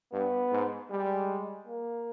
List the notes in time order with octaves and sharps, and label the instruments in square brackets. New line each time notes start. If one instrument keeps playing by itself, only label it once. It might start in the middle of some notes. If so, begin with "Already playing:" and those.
[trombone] G2 [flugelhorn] B3
[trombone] G#2
[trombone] G3 [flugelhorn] G#3
[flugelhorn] A#3